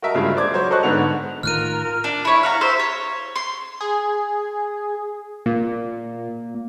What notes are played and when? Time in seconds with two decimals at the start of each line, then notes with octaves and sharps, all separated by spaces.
0.02 F#4 A#4 D#5 E5 A5
0.14 G2 C#3 G#3 A#3 F4
0.36 C5 D5 D6 G#6
0.53 F#3 C5 C#5
0.71 A4 C5 D#5 C#6 F#6
0.83 G#2 D3 B3 F#5 F7
1.43 A2 D#3 F4 A#4 F6 F#6 D#7
2.04 D4
2.25 E4 C#5
2.43 F5 F#5 A#5
2.61 C5 E5 F5
2.80 C#5
3.36 C6
3.81 G#4
5.46 A#2 A#3